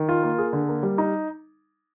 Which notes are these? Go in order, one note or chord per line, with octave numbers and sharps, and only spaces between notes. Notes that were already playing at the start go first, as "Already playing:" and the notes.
Already playing: D#3
F4
A#3
G#4
D3
A#3
G3
D#4